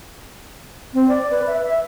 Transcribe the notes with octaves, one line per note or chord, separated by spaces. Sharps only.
C4
D5
B4
E5
E5